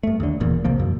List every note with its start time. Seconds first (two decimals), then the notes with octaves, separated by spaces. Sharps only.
0.03 G2 A3
0.20 D#2 D3
0.40 E1 E2 A#2
0.64 C2 C#3 F3 A#3
0.78 E1 F#2